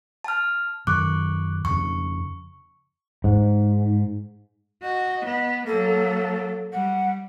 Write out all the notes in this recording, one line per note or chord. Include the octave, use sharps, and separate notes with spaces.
A5 F6
F#2 D#3 C#6 D6 F#6
F2 C#3 C#6
G#2
F#4 D#5
B3
F#3 A#3 A4
G3 F#5